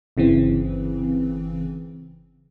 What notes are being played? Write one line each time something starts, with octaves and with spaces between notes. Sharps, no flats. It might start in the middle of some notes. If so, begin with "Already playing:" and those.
G1 C#3 E3 C4